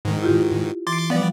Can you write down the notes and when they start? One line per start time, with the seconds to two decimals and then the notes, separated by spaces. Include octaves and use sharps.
0.05 G#2 D#3
0.22 E4 F4 G4
0.87 E3 C6 D6 A6
1.10 F3 G3 B3 D5